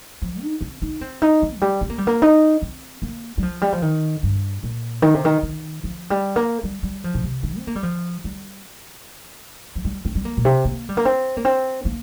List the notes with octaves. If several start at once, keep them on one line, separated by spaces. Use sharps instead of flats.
F3
D#4
C4
D#4
C4
D#4
C4
F3
G3
C4
A#3
G3
A#3
D#4
C4
A#3
G3
F3
G3
F3
D#3
G2
A#2
D#3
C3
D#3
D#3
F3
G3
A#3
G3
G3
F3
A#2
C3
D#3
C4
A#3
G3
F3
G3
F3
G3
C4
G3
A#3
A#2
C3
A#3
G3
A#3
C4
A#3
C4
A#3